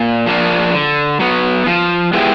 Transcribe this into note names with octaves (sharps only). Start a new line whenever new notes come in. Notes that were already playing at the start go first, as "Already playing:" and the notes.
Already playing: A#2
F3 A#3 D4
D3
F#3 B3
F3
G#3 B3 E4 G4